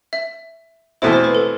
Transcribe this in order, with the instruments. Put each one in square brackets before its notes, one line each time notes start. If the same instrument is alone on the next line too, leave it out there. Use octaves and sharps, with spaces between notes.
[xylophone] E5
[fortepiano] E2 B2 A3 C4 E4 [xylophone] C5
[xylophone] C5
B4
A4